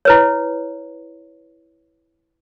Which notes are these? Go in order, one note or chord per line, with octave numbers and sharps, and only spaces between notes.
E4 B4 C#5